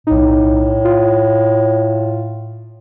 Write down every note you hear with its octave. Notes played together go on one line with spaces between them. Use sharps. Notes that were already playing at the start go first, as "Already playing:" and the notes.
B1 A2 D#4
F4